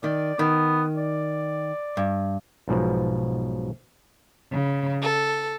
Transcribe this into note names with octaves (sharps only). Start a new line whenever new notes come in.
D#3 D5
D#3 B3
D5
G2
B1 G#2 B2 F3
C#3
A4